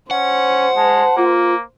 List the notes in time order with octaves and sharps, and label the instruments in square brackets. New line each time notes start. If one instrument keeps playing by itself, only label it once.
[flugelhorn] C#4 [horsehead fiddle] C5 [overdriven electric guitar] F#5
[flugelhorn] G#3 [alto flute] A5
[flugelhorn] A#3 [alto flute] F4